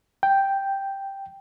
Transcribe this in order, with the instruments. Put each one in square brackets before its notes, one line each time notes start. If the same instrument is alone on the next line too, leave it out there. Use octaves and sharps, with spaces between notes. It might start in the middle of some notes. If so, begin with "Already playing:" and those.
[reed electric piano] G5